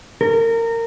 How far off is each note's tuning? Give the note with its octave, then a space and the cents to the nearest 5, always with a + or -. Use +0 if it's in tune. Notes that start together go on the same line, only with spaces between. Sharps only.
A#4 -25